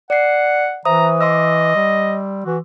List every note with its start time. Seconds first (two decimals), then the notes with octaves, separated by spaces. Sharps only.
0.10 D5 F#5 C7
0.85 E3 C5 E5 A#5 D#6
1.21 D#5 C6 D6 E6
1.76 G3
2.45 E3 F#4